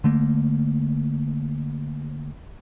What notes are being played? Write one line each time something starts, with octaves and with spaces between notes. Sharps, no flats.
D3 A3 A#3